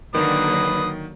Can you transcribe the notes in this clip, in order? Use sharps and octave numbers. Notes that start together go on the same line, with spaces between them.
D3 D#3 F#3 A#3 B4 D#6